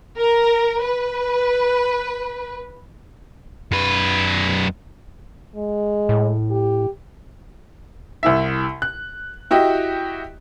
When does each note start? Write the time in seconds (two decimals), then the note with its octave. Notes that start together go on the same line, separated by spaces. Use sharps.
0.19 A#4
0.81 B4
3.72 F#2 B4
5.56 G#3
6.09 A2
6.51 G4
8.23 C2 E4 E5
8.82 F#6
9.51 E4 F#4 G4 D#5